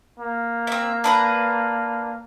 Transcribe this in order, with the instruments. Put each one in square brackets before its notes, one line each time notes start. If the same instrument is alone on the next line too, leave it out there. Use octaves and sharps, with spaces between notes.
[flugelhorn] A#3
[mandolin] C4 E5
D4 B4 A#5